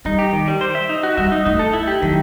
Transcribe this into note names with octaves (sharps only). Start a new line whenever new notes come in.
G3 D#4
G4
D#3
G3
C5
E5
D#4
F#4
G3 E5
D#4
A3 D#4
A4
E4
G4
D#3 F#3